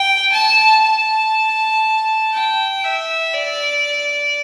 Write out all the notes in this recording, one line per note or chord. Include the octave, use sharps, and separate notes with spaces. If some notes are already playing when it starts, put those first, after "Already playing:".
Already playing: G5
A5
A5
G5
E5
D5